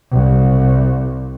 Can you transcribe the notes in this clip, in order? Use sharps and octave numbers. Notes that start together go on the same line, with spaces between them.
C2